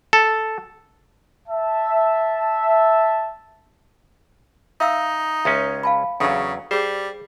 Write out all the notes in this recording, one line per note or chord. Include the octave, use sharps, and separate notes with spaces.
A4
E5 A5
D#4 E5 F5 E6
C#2 G#3 C#4 E5
F5 A5 B5
E2 C#3 F#3 D4 A4 F5
G3 G#4 C5